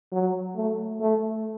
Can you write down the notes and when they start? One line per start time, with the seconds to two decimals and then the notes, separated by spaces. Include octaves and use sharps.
0.12 F#3
0.56 A3
1.01 A3